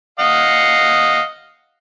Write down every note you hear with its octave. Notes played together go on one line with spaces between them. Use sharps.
D#5 F5 F#5